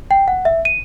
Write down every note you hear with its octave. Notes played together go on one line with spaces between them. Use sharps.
G5
F#5
E5
D#7